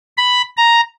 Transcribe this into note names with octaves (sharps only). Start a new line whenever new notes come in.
B5
A#5